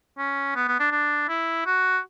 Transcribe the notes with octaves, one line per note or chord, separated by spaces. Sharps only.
C#4
B3
B3
D4
D4
E4
F#4